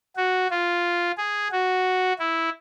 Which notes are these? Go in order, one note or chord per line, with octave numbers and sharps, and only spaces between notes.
F#4
F4
G#4
F#4
E4